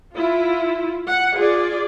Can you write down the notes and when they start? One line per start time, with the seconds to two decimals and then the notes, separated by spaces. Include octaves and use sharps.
0.15 E4 F4
1.07 F#5
1.36 F4 G#4 D5